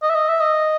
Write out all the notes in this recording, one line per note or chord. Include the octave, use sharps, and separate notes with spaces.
D#5
E5
D#5
E5
D#5